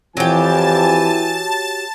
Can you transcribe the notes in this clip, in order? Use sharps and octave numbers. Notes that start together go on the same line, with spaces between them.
F2 E3 F#3 G4 G#5 A5 A6